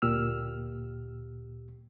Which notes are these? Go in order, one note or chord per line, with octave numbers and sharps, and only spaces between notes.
D2 A#2 G4 E6 F6